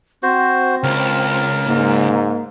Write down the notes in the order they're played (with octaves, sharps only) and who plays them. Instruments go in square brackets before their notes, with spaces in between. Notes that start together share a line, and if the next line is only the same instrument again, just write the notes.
[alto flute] C4 [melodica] F#4 C5
[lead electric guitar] C#2 [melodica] A#4
[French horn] G#2 [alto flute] A#3